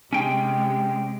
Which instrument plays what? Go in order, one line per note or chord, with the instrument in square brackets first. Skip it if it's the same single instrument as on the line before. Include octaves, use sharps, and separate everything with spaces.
[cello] C3 G#3 [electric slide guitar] C#4 G5